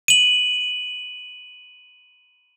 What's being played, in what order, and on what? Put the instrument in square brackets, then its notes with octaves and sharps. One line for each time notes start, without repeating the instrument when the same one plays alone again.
[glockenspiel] D#7 F#7